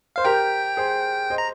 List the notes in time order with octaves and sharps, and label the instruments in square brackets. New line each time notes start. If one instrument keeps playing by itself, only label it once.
[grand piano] C5 [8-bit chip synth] F5
[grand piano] G4 A#4 [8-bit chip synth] G5
[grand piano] G#4 C5
C5 D#5
[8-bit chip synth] A#5